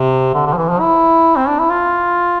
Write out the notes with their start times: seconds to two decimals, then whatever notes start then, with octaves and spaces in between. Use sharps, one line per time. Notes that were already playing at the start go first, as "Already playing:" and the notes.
Already playing: C3
0.35 D3
0.46 D3
0.53 F3
0.57 E3
0.69 F3
0.80 E4
1.36 C4
1.48 D4
1.59 E4
1.70 F4